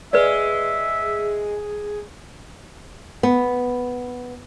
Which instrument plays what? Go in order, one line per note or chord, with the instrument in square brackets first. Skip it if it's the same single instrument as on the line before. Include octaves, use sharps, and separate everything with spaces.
[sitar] G#3 [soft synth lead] G#4 [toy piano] B4 D5 [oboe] E5
[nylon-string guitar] B3